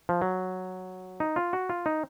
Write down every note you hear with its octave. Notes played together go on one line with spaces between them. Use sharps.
F3
F#3
D#4
F4
F#4
F4
D#4